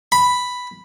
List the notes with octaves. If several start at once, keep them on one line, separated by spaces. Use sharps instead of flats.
B5